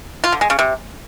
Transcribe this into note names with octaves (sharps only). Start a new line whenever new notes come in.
F4
D3
G#3
C#3
C3